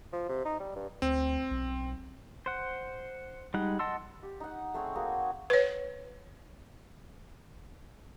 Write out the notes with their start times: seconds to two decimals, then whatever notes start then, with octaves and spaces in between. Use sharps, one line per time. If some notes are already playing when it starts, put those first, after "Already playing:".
0.13 F3
0.29 C3
0.45 D#4
0.60 G3
0.76 G2
1.02 D2 C4
1.51 B1
2.46 C5 F#5
3.54 G3 G#3 D#4 F#5
3.79 D#5 F#5 A5 C6 E6
4.23 G4
4.40 D#4 F#5
4.74 A3 C4 G#4 C#5
4.95 A#3 F#4 G#4
5.50 B4 C#5